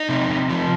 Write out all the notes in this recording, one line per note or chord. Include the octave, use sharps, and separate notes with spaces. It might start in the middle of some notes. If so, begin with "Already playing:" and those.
Already playing: D#4
C3
C3
F3